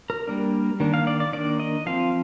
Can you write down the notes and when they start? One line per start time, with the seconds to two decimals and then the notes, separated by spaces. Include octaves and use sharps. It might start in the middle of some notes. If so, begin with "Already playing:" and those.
0.10 A#4
0.28 G3 A#3 D4
0.80 D#3 A#3 D4
0.94 F5
1.07 D5
1.20 D5
1.33 D#3 A#3 D4 D5
1.60 D#5
1.86 F3 C4 F5